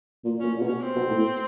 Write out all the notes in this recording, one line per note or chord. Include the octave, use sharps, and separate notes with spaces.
A#2
A#2 C#4
A#2
B2
C#4
C4
B2
A2